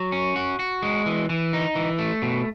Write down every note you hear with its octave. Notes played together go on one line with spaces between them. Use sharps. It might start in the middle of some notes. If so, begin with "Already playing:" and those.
Already playing: F#3
C#4
F#4
F#4
G#3
E3
E3
D#4
E3
A3
B2